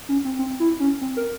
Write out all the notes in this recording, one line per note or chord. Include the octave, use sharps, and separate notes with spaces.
C#4
C4
C4
E4
C#4
C4
A#4